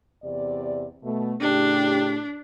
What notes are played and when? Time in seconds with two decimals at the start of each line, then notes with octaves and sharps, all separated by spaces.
0.22 E2 C3 D5
1.02 B2 A3
1.41 A2 C#3 D4 G4